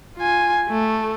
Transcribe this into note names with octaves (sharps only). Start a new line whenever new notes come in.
F4 G#5
A3